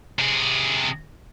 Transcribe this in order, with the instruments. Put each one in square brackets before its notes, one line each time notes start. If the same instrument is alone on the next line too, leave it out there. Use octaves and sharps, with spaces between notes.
[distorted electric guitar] C3 G#4